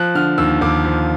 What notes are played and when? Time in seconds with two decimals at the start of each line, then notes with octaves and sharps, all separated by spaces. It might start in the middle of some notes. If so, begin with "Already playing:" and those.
Already playing: F3 F#6
0.15 D3 F6
0.38 D#2 E6
0.61 D#2 D6
0.84 F3